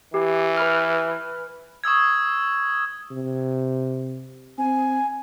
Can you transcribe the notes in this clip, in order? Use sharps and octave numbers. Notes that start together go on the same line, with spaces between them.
E3 G4
B4 B5 F6
C#6 D#6 E6 G#6
C3
C4 G#5